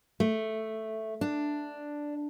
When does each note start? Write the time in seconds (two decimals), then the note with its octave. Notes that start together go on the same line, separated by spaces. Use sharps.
0.20 A3
1.21 D4